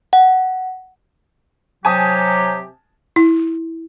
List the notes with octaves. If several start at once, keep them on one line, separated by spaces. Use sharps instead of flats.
F#5
C3 F#3 G4 G#5 A5 D#6
E4